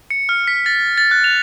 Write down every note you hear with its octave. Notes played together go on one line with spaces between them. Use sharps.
C#7
F6
B6
A6
A6
F#6
F7